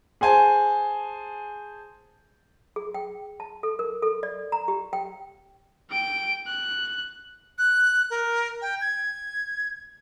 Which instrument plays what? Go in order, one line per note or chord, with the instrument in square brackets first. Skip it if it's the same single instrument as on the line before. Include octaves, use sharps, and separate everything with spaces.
[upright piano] G#4 C5 G#5 A5
[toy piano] G#4
G5
A5
A4
A#4
A4
D5
A#5
G4
G5
[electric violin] G5 D7
F#6
[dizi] F#6
A#4
G5
G#6